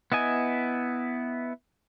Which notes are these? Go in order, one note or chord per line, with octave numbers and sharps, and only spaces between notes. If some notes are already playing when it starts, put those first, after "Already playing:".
B3 E4 D#5 G#5